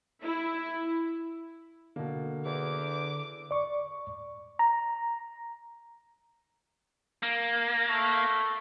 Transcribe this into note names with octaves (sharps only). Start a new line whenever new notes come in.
E4
B2 D3 A#3
E2 D6
D5 C#6
A#5
A#3
A3